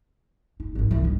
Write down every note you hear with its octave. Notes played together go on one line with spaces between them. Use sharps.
D#4
G#1 D#3
C2 E3
G2